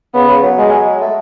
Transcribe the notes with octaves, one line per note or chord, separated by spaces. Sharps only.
C#3 B3
C#3
F#3
G#3
A3